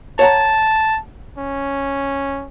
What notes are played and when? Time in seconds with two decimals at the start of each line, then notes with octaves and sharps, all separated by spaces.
0.19 C#5 F#5 A5 A#5
1.37 C#4